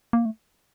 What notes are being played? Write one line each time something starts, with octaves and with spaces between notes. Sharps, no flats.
A#3
A3